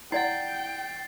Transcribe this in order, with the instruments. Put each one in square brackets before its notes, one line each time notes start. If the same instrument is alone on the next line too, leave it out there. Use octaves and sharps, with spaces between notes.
[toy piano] E4 D5 F#5 [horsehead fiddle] G5 [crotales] A6 C7